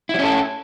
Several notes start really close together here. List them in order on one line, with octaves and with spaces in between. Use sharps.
E4 F#3 C#4 A4